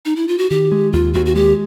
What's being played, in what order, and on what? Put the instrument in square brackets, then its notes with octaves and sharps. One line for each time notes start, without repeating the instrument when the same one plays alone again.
[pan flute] D#4
E4
F4
F#4
[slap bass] D#3 [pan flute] G4
[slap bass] G#3
[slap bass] D#2 [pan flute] F4
[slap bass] D#2 [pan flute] F#4
[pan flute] F#4
[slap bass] G#3 [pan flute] G4